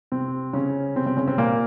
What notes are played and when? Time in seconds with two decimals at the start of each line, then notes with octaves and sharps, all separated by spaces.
0.12 C3 C4
0.53 C#3 C#4
0.96 C3 C4
1.06 C3 C4
1.17 C#3 C#4
1.27 C3 C4
1.38 A#2 A#3